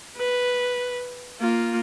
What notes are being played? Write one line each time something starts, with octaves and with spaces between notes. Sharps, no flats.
B4
A#3 F4